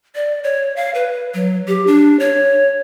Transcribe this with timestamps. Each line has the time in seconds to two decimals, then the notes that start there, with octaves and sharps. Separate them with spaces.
0.15 D5
0.44 C#5
0.76 F5
0.94 B4
1.34 F#3
1.68 G4
1.87 D4
2.19 C#5